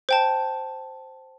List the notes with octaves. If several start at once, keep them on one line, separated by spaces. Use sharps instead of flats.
C5 G5 A5